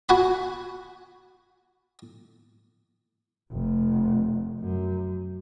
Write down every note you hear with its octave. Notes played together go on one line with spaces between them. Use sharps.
F#4 F#5 G#5 B5
F1
F#2